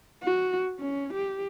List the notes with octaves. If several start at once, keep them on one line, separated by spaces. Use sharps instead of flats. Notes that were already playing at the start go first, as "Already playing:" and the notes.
F#4
C#4
G4